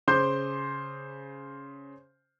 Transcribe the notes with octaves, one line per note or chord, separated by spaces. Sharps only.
C#3 C5 C6 D6 G6